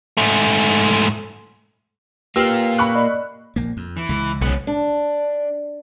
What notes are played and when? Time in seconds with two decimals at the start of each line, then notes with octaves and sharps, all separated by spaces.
0.17 G#2 A3
2.36 A#3 F4 G4 B4 G5 E6 F6
2.79 B5 C#6 F#6
2.95 D5 D#5
3.56 A#1 A#3
3.77 F2
3.97 E3
4.09 C#2 C#3
4.41 B1 B3 C#4
4.67 D4